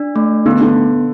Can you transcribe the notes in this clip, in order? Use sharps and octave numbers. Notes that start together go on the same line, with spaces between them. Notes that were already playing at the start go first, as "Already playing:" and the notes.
Already playing: D4
A3
D3 B3
D3